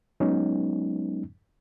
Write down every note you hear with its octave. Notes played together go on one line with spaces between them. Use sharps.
F#3 G#3 B3 C#4 D#4